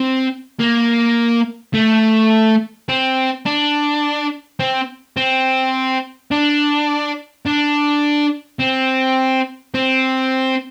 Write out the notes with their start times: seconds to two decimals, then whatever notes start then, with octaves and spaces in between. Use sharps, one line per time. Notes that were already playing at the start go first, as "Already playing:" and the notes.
Already playing: C4
0.59 A#3
1.74 A3
2.89 C4
3.46 D4
4.60 C4
5.17 C4
6.31 D4
7.46 D4
8.60 C4
9.74 C4